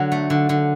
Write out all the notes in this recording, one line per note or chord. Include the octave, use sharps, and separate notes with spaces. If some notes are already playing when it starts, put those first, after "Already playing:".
Already playing: D3 F#3
A3
D3
D3